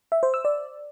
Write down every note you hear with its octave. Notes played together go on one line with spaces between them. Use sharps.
E5
C5
E6
D5